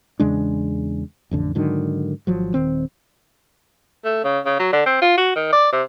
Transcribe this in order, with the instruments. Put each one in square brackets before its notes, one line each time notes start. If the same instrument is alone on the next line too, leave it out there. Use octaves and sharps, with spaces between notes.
[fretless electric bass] E2 C#3 G#3 D4
A1 F2 D3
G#2 D3 D#3 F#3
G#1 F3 F#3
D#1 D#3 C4
[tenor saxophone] A3
C#3
C#3
F#3
D3
C4
F4
F#4
D#3
D5
C3